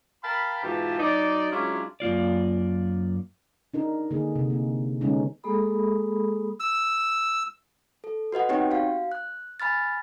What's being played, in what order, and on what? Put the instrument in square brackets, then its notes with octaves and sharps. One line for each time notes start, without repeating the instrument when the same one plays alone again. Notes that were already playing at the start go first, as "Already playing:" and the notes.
[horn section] A#4 F5 G5 A5 B5
G#2 B2 E3 F4 G4 A5
F#3 D#4 D5
F#3 G#3 C#4 D4 E4 F4
[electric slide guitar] F#2 A#3 F4 D5
[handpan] D4 D#4 A#4
D3 A#3 D#4 G#4
C3
A#3
D3 G#3 B3 C#4 D#4
[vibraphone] G#3 A#3 G#4 A4 B5 D#6
[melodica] E6
[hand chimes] A4
F#4 B4 D#5 F#5
B3 C4 D#4 G4 C#5 G5
F#4 F5
F#6
G#5 B5 F6 A6